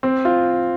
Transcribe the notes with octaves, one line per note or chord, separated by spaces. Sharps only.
C4
F4